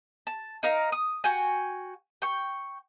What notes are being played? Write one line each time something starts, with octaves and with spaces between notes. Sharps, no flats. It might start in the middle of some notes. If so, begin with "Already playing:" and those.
A5
D#4 A#4 F5
D#6
F#4 G5 G#5
G5 C#6